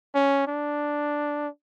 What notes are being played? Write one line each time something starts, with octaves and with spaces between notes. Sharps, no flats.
C#4
D4